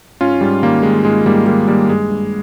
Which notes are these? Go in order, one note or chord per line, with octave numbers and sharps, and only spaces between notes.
G#2 C#4 F4
G#2 G3
D#3 G3 A#3
D#3 G#3
G#2 G#3
G#2 G3 A#3
D#3 G3 A#3
D#3 G3 A#3
G2 G#3
G2